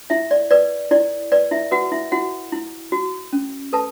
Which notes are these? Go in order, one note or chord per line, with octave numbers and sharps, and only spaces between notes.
E4 E5
D5
B4 D5
E4 D5
B4 D5
E4 E5
F#4 B4 F#5
E4 E5
E4 F#4 F#5
E4
F#4
C#4
A4 B4 A5